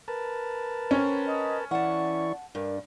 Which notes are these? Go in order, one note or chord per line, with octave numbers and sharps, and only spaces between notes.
A#4 B4 A5
C4 C#4
D#5
E3 E4 D5 F#5 A5 C#6
G2 D4 A#4